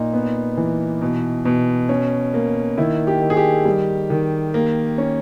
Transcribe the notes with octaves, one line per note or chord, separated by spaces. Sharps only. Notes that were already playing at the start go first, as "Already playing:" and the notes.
Already playing: A#2 D#4
B3
E3
B2
B2
C#4
A#3
D#3 E4
G4
D#3
G#4
G4
G3
D#3
A#3
C#4